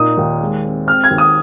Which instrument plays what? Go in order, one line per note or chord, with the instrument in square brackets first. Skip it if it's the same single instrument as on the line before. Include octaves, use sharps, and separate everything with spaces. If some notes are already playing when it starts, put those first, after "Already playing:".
Already playing: [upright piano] A#2 D#4 D#6
D#2
G#3
C4
C4 F6
G#6
D#2
D#6